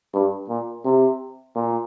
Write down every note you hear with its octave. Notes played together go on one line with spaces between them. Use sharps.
G2
A#2
C3
A#2